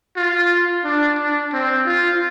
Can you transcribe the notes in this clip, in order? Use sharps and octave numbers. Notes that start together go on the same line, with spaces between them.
F4
D4
D4
C4
F4